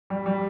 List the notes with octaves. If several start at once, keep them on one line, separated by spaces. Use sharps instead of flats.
G3
G3